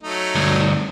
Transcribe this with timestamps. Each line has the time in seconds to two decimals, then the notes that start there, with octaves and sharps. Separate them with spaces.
0.03 F#3 A3 D#4
0.35 D2 G2